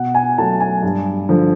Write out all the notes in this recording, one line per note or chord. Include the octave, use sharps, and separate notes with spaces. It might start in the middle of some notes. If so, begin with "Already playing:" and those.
Already playing: B2 F#5
G#5
F#3 A3 A5
G#5
G2
D3 F3